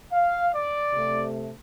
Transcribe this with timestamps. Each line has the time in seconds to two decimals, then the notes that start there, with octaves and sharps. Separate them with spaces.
0.12 F5
0.52 D5
0.93 C3 A3